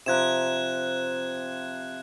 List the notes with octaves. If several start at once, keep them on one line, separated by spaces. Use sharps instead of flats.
C3 F3 A#5 F#6 G#6 E7